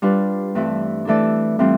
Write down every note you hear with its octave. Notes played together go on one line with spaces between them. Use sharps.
G3 D4 F4 B4
G2 E3 A3 C4 E4
E3 A3 D4 A4 D5
A2 E3 G3 C4 F4